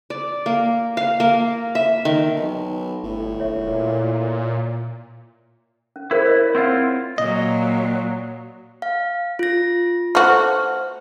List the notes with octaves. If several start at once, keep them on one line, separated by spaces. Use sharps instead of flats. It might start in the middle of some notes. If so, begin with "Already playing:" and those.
D5
A#3
F5
A#3
E5
D#3
B1
G1 A2
D#1 C#5 E5
A#2
C#4
E4 G#4 A#4 C5
C5 C#5 D#5
C4 E4 F4 C#5 F#5
A#2 F#3 D#5
F5
F4 A#6
A3 F#4 C5 F6